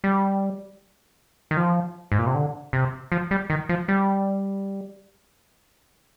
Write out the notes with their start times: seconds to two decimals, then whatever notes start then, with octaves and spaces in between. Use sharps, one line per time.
0.04 G3
1.51 D#3
1.57 F3
2.12 G#2
2.18 A#2
2.27 C3
2.34 D3
2.73 C3
3.12 F3
3.31 G3
3.50 D#3
3.69 F3
3.88 G3